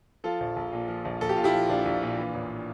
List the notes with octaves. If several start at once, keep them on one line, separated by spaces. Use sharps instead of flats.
F3 F4 A4
A#1
A#1
A#2
F3
A#1
A#1 A4
G4
A#2 F4
E4 G4
F3
A#1 D4 F4
A#1
A#2
E3
A1